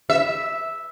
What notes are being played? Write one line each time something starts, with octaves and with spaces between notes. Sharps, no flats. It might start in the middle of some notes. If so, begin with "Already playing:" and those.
E5